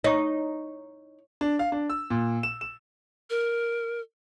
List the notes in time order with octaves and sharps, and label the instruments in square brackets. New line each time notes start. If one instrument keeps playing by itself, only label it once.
[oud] D#4 [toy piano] C#5 C#6
[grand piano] D4
F5
D4
E6
A#2
E7
E7
[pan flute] A#4